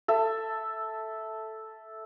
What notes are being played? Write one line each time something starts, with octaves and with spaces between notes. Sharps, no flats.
A4 E5